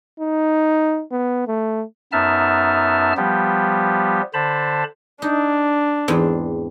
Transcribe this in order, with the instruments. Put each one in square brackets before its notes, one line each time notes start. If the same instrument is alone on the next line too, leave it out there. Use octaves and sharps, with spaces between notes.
[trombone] D#4
B3
A3
[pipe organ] F#2 B3 D#4 E5 A5 F6
F3 G3 B3 G4
D3 C5 A5 B5
[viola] D4 [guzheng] D#4
[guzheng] E2 G#2 C4